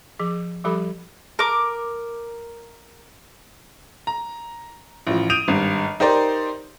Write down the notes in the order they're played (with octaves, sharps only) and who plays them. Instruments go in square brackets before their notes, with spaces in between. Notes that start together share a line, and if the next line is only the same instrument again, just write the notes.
[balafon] F3 G#4
F3 G3 G4 A4 B5
[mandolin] A#4 D6
[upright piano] A#5
A1 F3
D#6 G6 D7 D#7 F7
G#1 G2
D#4 G4 A#4 C5 D5